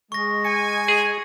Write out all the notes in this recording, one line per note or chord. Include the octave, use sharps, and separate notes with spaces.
G#3 C#6 A#6
G#5 C#7
G#4